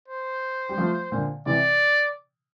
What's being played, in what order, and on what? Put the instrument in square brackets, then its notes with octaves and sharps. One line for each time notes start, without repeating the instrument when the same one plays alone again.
[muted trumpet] C5
[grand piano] G3
F3 A3
A#2 D3
[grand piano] C3 E3 [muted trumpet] D5